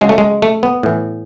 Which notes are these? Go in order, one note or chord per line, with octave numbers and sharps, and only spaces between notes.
C#3 F#3 G#3
A3
G#3
A3
B3
A2 E3